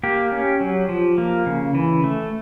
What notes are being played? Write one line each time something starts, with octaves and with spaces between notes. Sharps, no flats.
A#3 G4
C#4
F#3
F3
A#3
C#3
E3
A3